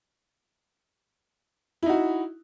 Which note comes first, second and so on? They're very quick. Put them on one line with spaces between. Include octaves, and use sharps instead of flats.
E4 D#4 F#4